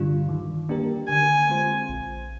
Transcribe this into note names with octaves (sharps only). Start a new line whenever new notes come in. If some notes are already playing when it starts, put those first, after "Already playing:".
Already playing: G2 D3 G3 D4 F4
D#3
A#3 D4 G4 A#4
D3 G#5
G#3 C4 F4 C5
A#1